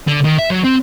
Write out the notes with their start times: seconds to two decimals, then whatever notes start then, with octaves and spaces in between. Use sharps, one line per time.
0.08 D3
0.24 D#3
0.39 E5
0.50 F#3
0.64 C4